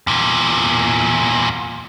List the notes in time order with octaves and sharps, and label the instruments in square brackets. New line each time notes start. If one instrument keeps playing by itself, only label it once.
[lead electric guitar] E2 A#2